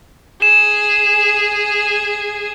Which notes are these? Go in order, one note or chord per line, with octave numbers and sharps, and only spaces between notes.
G#4 E7